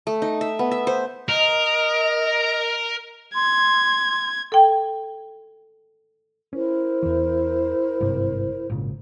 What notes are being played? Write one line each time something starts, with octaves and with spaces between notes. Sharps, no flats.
A3
D#4
E5
B3
E5
C5
A#4 D#5
C6 G#6
A4 G5
C#4 E4 A#4 C5
E2 E3
G#1 G2 C3
G#1 A#2 C#3